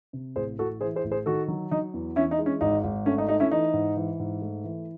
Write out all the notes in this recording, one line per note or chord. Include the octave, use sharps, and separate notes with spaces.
C3
A1 G#4 C5
A1 F#4 A4
E3 G#4 C5
G#4 C5
A1
G#4 C5
D#3 F#4 A4
F#3
F#3 D#4
E2
E3 C#4 E4
D#4
G#3
C#4
G#1 D#4
G#1
A3 C#4
D#4
A3 D#4
C#4 E4
E3 D#4
G#2
E3
G#2
A3
E3